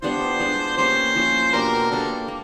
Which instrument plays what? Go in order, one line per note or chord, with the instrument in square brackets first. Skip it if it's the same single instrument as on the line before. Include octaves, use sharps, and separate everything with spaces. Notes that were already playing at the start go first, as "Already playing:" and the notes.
[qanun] G3 B3 D4 F4 [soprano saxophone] C5
[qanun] G#3 B3 D4 F4
[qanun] G3 A#3 C#4 [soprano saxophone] C5
[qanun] F3 A#3 C#4 F4
[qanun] B2 G3 A#3 D4 [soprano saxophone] A#4
[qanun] G3 A#3 D4 [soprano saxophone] A4
[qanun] A#3